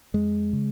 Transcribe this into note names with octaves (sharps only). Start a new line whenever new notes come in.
F2 G#3
C#3